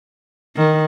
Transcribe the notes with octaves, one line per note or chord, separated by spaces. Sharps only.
D#3